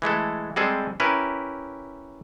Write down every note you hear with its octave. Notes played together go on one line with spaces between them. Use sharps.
E3 G#3 A3 A4
G3 G#3 C4 G#4 A4
C#4 E4 G4 A#4 B4